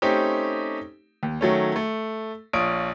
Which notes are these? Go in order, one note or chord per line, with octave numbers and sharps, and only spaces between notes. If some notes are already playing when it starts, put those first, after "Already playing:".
A3 C4 C#4 D#4 G4
D#2
D#3 F#3 A3 C#4
A3
A#1 F4 C#5 D#6 D7